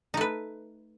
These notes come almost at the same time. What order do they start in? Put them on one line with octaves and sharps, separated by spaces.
D#4 A3 B4